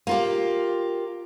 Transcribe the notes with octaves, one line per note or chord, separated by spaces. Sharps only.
A#3 F4 G4